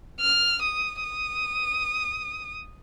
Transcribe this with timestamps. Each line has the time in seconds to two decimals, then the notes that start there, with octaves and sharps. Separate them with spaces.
0.20 F6
0.62 D#6
1.03 D#6